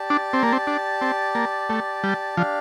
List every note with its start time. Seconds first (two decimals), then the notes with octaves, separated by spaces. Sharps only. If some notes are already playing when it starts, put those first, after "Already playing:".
Already playing: G4 D5 A5
0.10 D4
0.33 C4
0.43 A#3
0.53 C4
0.67 D4
1.01 C4
1.35 A#3
1.70 A3
2.04 G3
2.37 F3 D4 G4 D5 F5